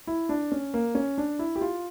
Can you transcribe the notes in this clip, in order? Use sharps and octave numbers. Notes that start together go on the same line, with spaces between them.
E4
D4
C#4
A#3
C#4
D4
E4
G4
F4